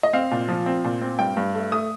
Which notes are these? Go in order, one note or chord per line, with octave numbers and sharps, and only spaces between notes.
D#5
C4 F5
A#2
F3
C4
A#2
C4
G2 G5
G2
A3
A3 D#6